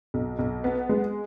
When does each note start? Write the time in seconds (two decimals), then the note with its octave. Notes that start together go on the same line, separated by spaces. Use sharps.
0.14 B1
0.39 B1
0.64 B3
0.89 G#3